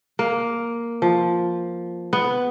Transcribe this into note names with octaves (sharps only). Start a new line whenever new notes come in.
A#3
F3
B3